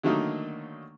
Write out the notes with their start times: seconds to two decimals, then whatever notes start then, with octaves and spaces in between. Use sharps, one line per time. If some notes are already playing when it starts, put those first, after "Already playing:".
0.03 D3 D#3 F#3 A3 A#3 D#4